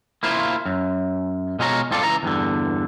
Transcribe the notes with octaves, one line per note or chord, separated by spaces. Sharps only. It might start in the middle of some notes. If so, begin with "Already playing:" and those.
A#3 E4 F4 C5
F#2
B2 G#3 F4 C#5 A#5
G#2 C4 F4 A4 D5
C#2 E3 A#5
E2 G2 D3